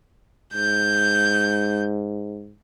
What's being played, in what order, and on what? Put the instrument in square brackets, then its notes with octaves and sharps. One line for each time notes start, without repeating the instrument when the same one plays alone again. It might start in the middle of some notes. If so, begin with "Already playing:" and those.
[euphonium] G#2 [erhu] G6